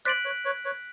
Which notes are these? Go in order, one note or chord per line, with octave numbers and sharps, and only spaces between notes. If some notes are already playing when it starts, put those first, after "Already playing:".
C5 D5 F#6 B6 D7 F#7
B4 C#5
B4 C#5
B4 C#5